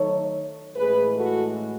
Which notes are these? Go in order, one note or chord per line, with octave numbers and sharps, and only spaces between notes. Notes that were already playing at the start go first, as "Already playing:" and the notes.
Already playing: D#3 F#3 A3 D#4 A4 C#5
A2 E3 G#3 C#4 G#4 B4
F#4 A4